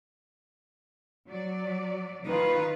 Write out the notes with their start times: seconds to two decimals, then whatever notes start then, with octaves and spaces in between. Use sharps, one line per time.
1.29 F#3 D5
2.25 D#3 D#4 F4 B4